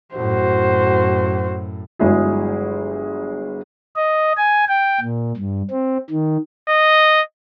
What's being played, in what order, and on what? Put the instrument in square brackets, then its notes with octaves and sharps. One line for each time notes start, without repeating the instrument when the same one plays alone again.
[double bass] F#2 A2 [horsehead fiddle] F#4 C5
[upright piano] G1 F#3 G#3 E4 G#4
[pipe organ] D#5
G#5
G5
A#2
G2
C4
D#3
[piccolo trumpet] D#5